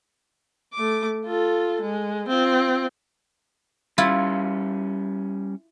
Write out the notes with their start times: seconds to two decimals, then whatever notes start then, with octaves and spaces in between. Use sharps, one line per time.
0.73 A3 D6
1.25 F4 A4
1.81 G#3
2.28 C4 F4
3.98 G3 C#4 E4 F4